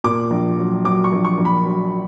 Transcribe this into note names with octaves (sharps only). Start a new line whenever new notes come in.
A#2 D6
A#1
F#3
F#3 D6
C#6
A#1
C#6
A#1
B5
F#3